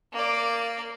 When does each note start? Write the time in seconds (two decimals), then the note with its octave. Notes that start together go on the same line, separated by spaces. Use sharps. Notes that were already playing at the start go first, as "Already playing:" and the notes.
0.12 A#3 D5